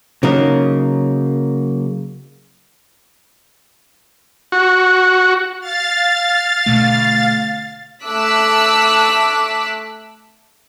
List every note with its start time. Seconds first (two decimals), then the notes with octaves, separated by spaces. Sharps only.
0.23 C#3 F#3 A#3 D#4 A#4
4.52 F#4
5.60 F5 A6
6.66 B2 D3 A3
8.05 A3 D6 E6 F#6 B6